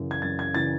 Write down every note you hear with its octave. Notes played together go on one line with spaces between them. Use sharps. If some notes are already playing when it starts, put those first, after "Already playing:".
Already playing: F#2 C#3 E3
G#6
F#2 A6
G#6
C#3 E3 A6